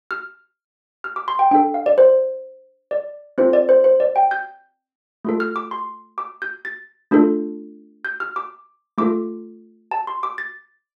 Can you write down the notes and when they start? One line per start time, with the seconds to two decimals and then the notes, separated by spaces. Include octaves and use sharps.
0.11 F6
1.04 F6
1.16 D6
1.28 C6
1.39 G5
1.51 D4 G5
1.55 A4
1.74 F5
1.86 D5
1.98 C5
2.91 D5
3.38 C4 F4 A4 C5
3.53 D5
3.69 C5
3.84 C5
4.00 D5
4.16 G5
4.31 G6
5.25 A3 F4 A4
5.40 F6
5.56 D6
5.71 C6
6.18 D6
6.42 G6
6.65 A6
7.11 A3 D4 F4 A4
8.05 G6
8.20 F6
8.36 D6
8.98 A3 F4 A4 D6
9.91 A5
10.07 C6
10.23 D6
10.38 A6